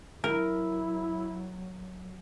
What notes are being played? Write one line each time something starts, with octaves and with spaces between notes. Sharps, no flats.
F#3 E4 A#4